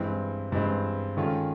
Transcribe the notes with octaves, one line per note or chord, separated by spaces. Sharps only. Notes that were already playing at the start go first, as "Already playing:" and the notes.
Already playing: G2 E3 G#3 C4
G2 E3 G#3 C4
D#3 G#3 C#4 F4 A4